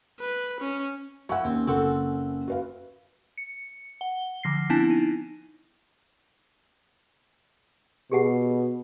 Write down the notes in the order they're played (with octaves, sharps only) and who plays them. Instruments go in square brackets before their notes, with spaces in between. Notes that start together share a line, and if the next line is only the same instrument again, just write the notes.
[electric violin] B4
C#4
[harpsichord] F3 E4 [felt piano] F#5 C#6
[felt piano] D#2 [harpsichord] C4 [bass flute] C#4
[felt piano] F#1 [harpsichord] C4 F#4 A4
[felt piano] F#4 B4 F5
[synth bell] C#7
F#5 G7
D3 F3 A#6 C7
B3 C4 D4 E4 G#5 A5
D#4
[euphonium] B2 [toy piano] G4 G#4 F#5